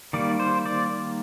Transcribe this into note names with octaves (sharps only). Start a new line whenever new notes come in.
D#3 G3 A#3 D5
C5
D5